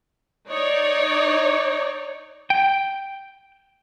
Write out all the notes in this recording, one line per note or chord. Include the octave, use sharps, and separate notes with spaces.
D#4 C#5 D5
G5